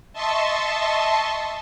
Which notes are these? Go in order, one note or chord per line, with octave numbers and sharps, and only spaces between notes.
D#5 E5 A5 C6 C#6